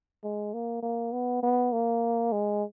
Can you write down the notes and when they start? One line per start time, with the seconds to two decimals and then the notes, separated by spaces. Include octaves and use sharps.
0.24 G#3
0.54 A#3
0.83 A#3
1.13 B3
1.43 B3
1.73 A#3
2.32 G#3